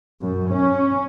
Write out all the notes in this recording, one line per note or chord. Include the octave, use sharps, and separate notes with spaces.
F#2
C#4